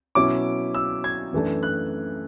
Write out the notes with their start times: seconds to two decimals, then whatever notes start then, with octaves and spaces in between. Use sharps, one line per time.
0.15 B2 F#3 C#4 E4 D6
0.75 E6
1.04 G#6
1.33 F#2 E3 A3 D4
1.63 F#6